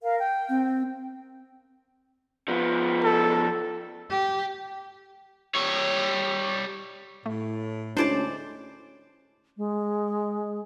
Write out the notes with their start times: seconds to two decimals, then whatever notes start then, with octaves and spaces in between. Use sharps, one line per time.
0.03 A#4 F5
0.18 G5
0.49 C4
2.48 F3 B3
3.04 A4
4.11 G4
5.55 G3 C#5
7.26 A2 A3
7.97 D2 G#3 C#4 D4 E4 C5 D5 A5
9.57 G#3